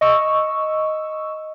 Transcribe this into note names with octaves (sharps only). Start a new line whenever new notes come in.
D#5 C#6 E6